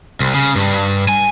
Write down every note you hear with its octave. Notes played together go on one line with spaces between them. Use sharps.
C2
C#3
G2
G#5